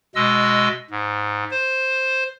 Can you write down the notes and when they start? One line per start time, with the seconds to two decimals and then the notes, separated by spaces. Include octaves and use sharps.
0.15 B2 G#3 D#5 E6
0.90 G#2
1.51 C5